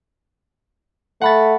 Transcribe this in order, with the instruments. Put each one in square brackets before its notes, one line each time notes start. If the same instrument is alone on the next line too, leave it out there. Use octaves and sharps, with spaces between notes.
[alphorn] A3 [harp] F#5 B5 A6